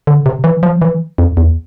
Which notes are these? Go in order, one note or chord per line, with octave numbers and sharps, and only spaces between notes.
D3
C3
E3
F3
E3
F2
E2